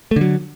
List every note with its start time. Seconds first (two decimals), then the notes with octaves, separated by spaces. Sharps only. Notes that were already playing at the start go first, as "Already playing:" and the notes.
0.11 A3
0.16 D3
0.21 F#3